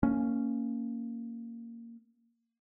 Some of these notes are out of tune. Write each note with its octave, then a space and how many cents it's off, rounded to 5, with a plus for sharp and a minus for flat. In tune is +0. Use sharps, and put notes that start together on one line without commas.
A#3 -10 C#4 +0